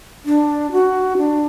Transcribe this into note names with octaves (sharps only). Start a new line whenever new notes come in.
D4
F#4
D4